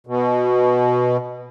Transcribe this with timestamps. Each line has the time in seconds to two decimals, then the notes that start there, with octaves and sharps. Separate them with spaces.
0.07 B2